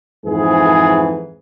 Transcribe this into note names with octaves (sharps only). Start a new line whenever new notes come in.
F2 G#2 E3 G#4